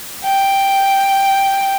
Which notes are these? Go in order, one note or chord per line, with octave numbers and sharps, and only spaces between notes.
G5